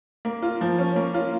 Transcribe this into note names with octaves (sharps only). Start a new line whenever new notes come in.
A#3
F4
F3
C#4
A#3
F4